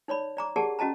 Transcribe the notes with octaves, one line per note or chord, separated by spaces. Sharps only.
D#4 C#5 D5 B5
D5 A#5 D6
G4 G#4 A#4 D5 F#5 A5
C#4 F#4 D#5 A5 A#5